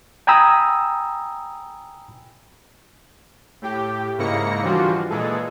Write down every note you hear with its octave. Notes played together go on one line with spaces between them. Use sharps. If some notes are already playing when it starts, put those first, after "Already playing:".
G5 G#5 A#5 B5 D#6 E6
A2 G4
G#2 C#3 A#3 E4 A#6 C#7
D3 E3 F3 G3 F4 F#4
A#2 E3 G#3 G#4 A4